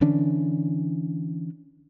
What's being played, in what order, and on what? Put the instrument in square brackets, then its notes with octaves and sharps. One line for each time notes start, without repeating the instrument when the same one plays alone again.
[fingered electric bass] D3 E3 C#4 D4